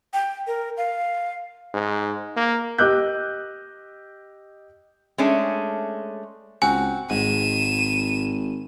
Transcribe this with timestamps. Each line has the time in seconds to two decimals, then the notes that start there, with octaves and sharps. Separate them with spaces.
0.13 G5
0.47 A#4
0.77 F5
1.74 G#2
2.36 A#3
2.78 G4 D#5 D6 E6 F#6 G6
5.18 G#3 A3 C#4 D4
6.62 C#2 C4 F#4 G#5
7.10 G#1 G#2 D#7 E7